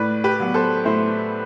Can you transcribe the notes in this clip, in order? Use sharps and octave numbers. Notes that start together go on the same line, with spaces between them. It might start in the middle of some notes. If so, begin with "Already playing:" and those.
Already playing: A2 B4 D5
G4 B4
F#3 B3
A4 C5
A2 C5 E5